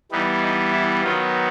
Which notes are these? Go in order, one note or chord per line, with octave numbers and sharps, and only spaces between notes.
E3 G3 B3 D#4
D#4
E4
D#3 F#3 B3 F4